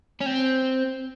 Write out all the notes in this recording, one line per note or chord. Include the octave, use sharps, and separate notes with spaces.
C#4
C4